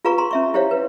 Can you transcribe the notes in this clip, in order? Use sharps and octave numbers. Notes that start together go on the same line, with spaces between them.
F4 G#4 B4 F5 A#5 C#6
A#5 C6
C#4 E5 C#6
E4 G4 C5 C#5 F5
B4